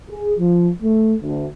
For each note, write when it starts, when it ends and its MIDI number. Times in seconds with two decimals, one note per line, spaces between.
0.11 0.34 68
0.39 0.70 53
0.82 1.16 57
1.23 1.46 38